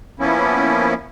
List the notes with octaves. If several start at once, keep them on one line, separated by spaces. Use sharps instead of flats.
F3 A#3 B3 C#4 E4